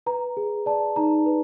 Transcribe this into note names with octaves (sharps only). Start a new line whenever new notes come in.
B4 A#5
G#4
D5 A5
D#4 A#5
B4